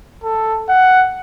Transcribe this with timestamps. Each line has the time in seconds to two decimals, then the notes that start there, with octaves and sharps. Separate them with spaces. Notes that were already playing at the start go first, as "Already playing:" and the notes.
0.24 A4
0.69 F#5